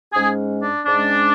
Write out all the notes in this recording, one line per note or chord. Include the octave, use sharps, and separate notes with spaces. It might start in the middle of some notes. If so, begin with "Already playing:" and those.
G#2 G#3 C#4 G#4
D4
G#2 G#3 C#4 D4